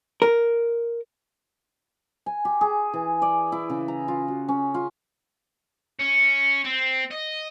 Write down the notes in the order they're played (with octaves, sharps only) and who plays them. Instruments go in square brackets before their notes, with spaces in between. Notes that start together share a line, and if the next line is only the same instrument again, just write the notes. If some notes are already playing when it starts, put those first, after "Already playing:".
[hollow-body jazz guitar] A#4
[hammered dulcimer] G#5
G4
G#4
E3
D5
E4
C#3
A#5
F4
F#4
C#4
F4
[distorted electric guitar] C#4
C4
D#5